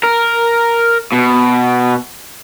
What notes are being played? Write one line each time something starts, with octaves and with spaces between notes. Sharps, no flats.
A#4
B2